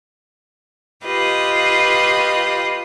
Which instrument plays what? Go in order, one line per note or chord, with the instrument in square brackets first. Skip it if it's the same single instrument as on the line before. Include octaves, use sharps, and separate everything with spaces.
[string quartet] F4 G4 B4 D#5